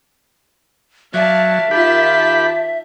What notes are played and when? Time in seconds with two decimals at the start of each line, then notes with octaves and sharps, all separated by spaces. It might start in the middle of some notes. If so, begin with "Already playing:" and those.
1.14 F#3 D5 E5 F5 A5
1.71 D#3 F4 G4 A5 B5